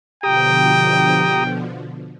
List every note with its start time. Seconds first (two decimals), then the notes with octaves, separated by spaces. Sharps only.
0.23 B2 D3 F3 G4 G5 A#5 D#6